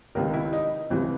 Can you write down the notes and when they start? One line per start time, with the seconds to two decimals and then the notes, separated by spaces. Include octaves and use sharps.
0.15 C#2 C3 D#3 A#4
0.34 E4
0.53 D#4
0.90 C#2 C3 E3 C4